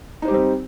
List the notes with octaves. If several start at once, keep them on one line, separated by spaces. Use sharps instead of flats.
G3 C4 D#4 G4 C5